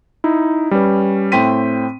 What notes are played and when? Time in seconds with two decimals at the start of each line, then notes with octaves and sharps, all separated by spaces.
0.24 D#4 E4
0.71 G3 C#4 B4
1.32 A2 C4 G5 C6 B6 D#7